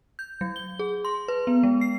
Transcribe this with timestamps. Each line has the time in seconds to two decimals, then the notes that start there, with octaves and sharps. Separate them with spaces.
0.19 G6
0.41 F#3
0.56 G7
0.79 G#4
1.05 C6
1.28 B4
1.47 B3
1.63 G#3
1.81 C7